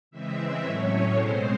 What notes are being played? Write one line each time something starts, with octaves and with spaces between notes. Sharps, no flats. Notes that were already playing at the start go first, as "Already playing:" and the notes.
C#3 E3 G#3 C4 E5
A2 F#3 A3 C#4 C#5
B2 G#3 C4 C5